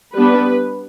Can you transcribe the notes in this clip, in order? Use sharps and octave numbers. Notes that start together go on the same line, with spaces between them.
G3 B3 D4 B4